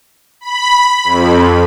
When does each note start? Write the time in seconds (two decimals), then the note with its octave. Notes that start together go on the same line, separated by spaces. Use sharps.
0.41 B5
1.04 F2